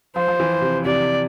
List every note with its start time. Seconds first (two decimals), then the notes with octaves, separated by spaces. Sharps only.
0.16 F3 C5
0.28 F3
0.40 E3
0.61 C3
0.85 C3 D5